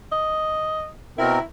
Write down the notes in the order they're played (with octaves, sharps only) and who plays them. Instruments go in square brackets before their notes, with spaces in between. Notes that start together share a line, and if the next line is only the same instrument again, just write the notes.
[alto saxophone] D#5
[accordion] B2 C4 A#4 [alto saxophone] E4